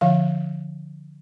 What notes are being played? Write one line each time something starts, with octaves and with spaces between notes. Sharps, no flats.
D3 F3 F5